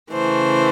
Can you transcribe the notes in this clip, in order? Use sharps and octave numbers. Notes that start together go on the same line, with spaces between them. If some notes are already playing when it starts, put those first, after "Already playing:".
C#3 E3 A3 C5